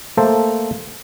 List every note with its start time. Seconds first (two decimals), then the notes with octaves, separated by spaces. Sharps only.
0.17 A3 A#3 A4 C5 A5